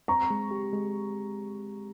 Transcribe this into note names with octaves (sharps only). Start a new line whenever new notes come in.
C4 A#5 C#6
G#3
G4
G#3